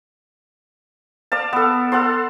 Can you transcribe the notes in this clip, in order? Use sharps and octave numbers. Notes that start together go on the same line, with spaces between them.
D5 F5 A5
B3 A4
A4 F#5 A5 C6